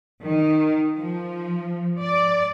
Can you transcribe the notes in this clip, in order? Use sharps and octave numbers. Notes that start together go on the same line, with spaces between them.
D#3
F3
D5